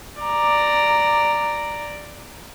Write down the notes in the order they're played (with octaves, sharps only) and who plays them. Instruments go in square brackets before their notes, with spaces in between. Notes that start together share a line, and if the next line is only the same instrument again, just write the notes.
[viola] D5 A#5